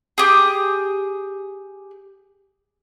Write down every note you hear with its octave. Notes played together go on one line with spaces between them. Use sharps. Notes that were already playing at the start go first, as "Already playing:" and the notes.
G4 G#4